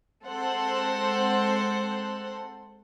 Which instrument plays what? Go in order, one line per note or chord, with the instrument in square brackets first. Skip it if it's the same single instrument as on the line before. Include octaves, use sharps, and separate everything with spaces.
[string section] G#3 C4 A4 C5 F#5